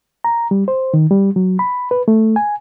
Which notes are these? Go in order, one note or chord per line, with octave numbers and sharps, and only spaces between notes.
A#5
G3
C5
D#3
G3
F#3
B5
B4
A3
G#5